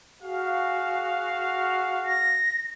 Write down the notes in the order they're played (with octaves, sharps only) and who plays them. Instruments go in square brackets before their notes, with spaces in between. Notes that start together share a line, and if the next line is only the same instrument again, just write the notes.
[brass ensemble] F#4 G#4 F5
[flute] A#6